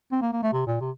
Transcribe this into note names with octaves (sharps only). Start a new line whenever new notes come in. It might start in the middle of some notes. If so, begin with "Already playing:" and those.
C4
A#3
A#3
A3
C3
A#2
C3